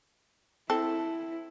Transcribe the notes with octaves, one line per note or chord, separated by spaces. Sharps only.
C4 E4 A4